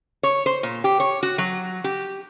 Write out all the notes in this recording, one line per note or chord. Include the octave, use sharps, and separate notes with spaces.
C#5
C5
A#2
G4
C#5
F#4
F#3
G4